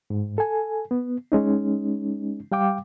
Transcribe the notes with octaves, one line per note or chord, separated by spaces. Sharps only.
G#2
A4 G#5
B3
G#3 C#4 D#4
G3 F5 G5 D6